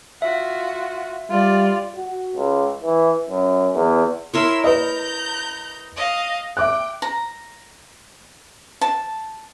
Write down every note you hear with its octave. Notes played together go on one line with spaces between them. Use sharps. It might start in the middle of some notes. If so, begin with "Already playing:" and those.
F4 F#4 E5
G3 F4 D5
F#4
C#2
E3
F#2
E2
E4 A#4 C#5 C6 E6
B4 D#5 A#5 G6
D#5 F5
E5 G5 D6 F#6
A#5
A5